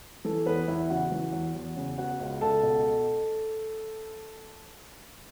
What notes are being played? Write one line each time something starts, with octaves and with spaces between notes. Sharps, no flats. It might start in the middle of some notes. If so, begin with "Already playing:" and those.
E3 A4
E2 B3 B4
E2 E4 E5
C#3 F#4 F#5
E3
E2
E2
C#3
B3 F#4 F#5
C#2
C#2 A4 A5
B2